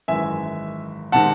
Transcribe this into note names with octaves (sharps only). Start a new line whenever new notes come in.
G#1 F#2 E3 G#3 E5 G#5
C3 D#3 G#3 F#5 A5